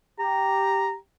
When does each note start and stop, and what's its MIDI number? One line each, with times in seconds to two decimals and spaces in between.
0.19 0.97 67
0.19 0.95 82